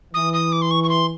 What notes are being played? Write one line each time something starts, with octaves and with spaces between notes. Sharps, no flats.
E3 D#6
D#6
D6
C6
C#6
C#6
C6